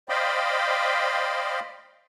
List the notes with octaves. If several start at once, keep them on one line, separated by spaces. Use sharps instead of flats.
C5 D5 D#5 F5 G5 B5